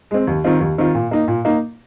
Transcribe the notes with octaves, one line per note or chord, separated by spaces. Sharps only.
G#3 C4
D#2
D#3 C4 F4
D#2
D#3 C4 F4
A#2
A#3 D#4
A#2
A#3 D#4